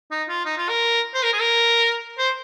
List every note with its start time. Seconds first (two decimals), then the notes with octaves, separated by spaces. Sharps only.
0.11 D#4
0.29 F4
0.46 D#4
0.57 F4
0.69 A#4
1.14 C5
1.23 A#4
1.33 G#4
1.41 A#4
2.18 C5